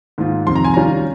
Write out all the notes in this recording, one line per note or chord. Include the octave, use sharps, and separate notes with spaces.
G#2 D#3 A#3 F4
F2 C3 D#3 C6
A#5
G#5
D#3 G3 C#4 F4 A#5